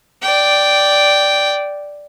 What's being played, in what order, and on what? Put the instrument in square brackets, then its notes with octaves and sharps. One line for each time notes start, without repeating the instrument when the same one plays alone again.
[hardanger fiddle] D5 G5